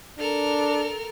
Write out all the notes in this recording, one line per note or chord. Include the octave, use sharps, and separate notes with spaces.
D4 A4 A#4 F6